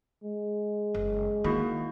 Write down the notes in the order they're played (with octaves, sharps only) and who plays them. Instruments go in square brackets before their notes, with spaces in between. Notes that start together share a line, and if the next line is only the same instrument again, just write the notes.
[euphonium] G#3
[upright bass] F#1
[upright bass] D#3 [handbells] A#3 E4 F#4